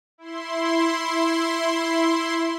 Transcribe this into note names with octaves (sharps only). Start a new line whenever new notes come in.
E4 C6